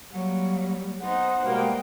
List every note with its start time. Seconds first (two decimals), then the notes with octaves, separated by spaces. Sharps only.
0.12 F#3 G3 A#3
1.01 B3 D#4 C5 F#5
1.44 B2 G3 G#3 A#3 G5